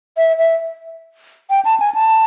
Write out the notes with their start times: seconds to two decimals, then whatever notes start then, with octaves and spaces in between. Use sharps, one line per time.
0.17 E5
0.39 E5
1.50 G5
1.65 A5
1.80 G#5
1.95 A5